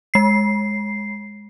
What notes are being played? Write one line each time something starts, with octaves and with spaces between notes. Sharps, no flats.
G#3 C7